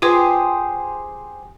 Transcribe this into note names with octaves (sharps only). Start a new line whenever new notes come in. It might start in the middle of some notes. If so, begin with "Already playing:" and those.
F4 G4 G#4 B4 C5